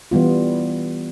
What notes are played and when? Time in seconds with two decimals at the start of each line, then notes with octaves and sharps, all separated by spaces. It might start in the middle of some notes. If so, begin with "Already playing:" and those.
0.11 E3 G3 B3 F4